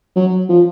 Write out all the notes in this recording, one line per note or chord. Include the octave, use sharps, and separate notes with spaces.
F#3
F3